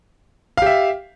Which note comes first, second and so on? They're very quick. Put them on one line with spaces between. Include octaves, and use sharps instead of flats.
F5 G4 E5